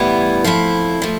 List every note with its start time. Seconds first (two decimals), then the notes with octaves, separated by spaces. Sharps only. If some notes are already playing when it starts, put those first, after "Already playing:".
Already playing: A2 E3 G3 B3 E4
0.44 F3 A3 C4 E4
1.02 F3 A3